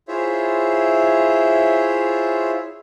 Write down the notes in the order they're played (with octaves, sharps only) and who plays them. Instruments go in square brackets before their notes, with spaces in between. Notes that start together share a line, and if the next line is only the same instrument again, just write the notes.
[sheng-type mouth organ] E4 F4 G#4 C5 C#5 E5